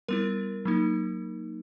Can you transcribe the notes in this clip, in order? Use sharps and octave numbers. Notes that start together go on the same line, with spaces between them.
G3 B3 E4 A#4
F#3 A#3 D#4